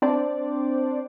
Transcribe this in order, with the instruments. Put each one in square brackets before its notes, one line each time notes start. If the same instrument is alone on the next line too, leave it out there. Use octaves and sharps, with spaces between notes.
[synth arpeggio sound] C4 D4 C5 D5